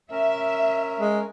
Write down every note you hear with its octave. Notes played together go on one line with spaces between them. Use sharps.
C#4 A#4 E5
G#3